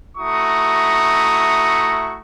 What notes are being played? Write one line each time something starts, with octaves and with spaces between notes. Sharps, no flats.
A3 E4 F#4 A#5 C#6 D#6